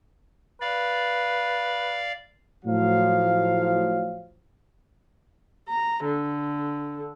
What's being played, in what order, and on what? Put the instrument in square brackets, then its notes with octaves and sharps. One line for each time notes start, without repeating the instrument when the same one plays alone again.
[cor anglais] B4 [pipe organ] D5 F5
[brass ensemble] A2 F3 F#3 F5
[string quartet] A#5
D3